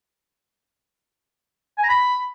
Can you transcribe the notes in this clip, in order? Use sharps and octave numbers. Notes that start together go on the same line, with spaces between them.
G#5
A#5
B5